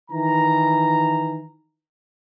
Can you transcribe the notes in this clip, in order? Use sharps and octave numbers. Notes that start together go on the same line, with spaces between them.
D#3 E3 A#5